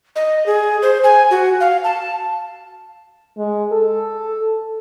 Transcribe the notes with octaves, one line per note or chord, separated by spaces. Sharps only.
D#5
G#4
C5
G#5
F#4
F5
A5
G#3
A4